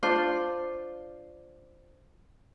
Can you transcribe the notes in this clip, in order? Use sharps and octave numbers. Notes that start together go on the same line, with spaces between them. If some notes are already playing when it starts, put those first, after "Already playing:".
D4 F4 C5 D5